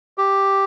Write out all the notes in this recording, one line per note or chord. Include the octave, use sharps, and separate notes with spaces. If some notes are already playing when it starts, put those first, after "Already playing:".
G4